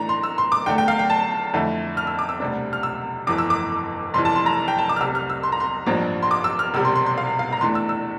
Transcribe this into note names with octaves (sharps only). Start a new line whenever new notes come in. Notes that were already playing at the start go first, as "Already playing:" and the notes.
Already playing: A2 E3 A3 D4 A#5
C6
E6
C6
D6
E2 D3 A3 G5
G5
F5
G5
A5
F2 D3 A3 E4
F6
E6
D6
E6
E1 D2 C3 G3 D4
F6
E6
G1 F2 E3 D6
E6
D6
F1 F2 E3 C6
A5
C6
A#5
G5
A5
D6
F6
C2 C3 G3 E6
F6
E6
C6
A#5
C6
A1 G2 F3 A#3 D4
C6
D6
E6
F6
E1 E2 C3 G3 E6
C6
C6
C6
F5
F5
A#5
E2 E3 A3 D4 C6
E6
E6